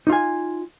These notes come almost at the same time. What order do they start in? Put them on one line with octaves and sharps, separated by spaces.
D#4 F4 G#5